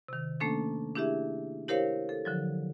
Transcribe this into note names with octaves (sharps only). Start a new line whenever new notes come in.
C3 D#3
A3 A#3 C#4 D4 A4
D4 E4 G4 G#4 E5
E4 G4 A#4 C5 C#5 F5
A4
D3 F3 F#3